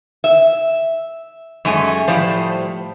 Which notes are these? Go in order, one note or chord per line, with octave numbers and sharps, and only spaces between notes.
E5
F#2 G#3 A3 G#5
A2 F3 G3 C5